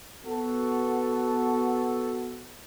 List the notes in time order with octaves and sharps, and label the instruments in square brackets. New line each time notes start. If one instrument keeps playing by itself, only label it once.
[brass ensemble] B3 F#4 A4